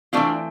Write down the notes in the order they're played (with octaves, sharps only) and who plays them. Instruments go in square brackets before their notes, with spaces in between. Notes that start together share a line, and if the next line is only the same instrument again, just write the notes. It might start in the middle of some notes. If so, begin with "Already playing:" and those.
[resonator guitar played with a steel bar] E3 A3 C4 D4 F4